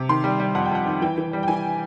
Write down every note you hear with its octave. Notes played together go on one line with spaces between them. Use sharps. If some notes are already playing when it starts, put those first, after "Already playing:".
Already playing: C3
D#3 C6
G3
G3
F2 F#5
G5
F2 F#5
D#3
E3 G5
E3
G3
G5
E3 G#5